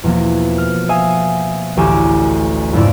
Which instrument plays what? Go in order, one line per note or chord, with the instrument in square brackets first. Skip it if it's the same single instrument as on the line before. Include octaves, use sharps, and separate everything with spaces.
[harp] E2 B2 F3 A#3
F6
E5 F5 G#5 D#6
A1 D2 G4 G#5 D6 E7
F2 G#2 C#3 D4 E4 D5